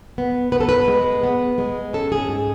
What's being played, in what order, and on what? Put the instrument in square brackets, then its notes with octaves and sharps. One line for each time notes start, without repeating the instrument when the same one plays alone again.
[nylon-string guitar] B3
B3 B4
A4
B4
G#3
B3
G#3
C#4 A4
G#4
G#2